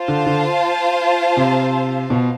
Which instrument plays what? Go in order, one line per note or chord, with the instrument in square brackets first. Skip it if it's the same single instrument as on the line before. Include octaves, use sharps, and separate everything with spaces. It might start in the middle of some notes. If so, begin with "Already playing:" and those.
Already playing: [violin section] F4 C5 F5 A5
[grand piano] D3
D3
C3
B2